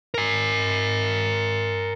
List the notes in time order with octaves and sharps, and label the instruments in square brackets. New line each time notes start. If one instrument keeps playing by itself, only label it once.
[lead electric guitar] A#4 G#5